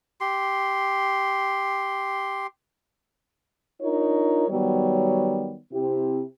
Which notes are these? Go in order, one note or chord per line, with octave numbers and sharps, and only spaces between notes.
G4 C6
D4 D#4 F4 A#4 C#5
D#3 F#3 G3 B3 C#5
C3 C4 E4 G4